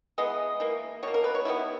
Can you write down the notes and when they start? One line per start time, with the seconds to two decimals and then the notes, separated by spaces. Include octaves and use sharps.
0.18 E3 G#3 B3 D#5
0.60 E3 A#3
1.03 B2 C#5
1.07 A#3
1.14 A#4
1.24 B4
1.35 C#5
1.45 D#3 G3 B3 E4